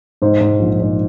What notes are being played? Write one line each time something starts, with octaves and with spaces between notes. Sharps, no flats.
G#2 C5
G#2
A#1
G#2